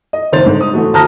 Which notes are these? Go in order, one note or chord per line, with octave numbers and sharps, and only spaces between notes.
D#5
F#1 D#3 C5 A6 F7
G#2 D3
D#6
E3 A3 F#4
D2 A5 A#5 D#6 F6 A#6